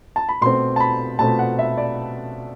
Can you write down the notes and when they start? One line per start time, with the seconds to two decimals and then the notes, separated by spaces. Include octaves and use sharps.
0.16 A5
0.29 B5
0.41 B2 A3 C4 C6
0.76 A5
0.80 B5
1.19 B2 A3 C4 A5
1.39 F#5
1.59 E5
1.78 D5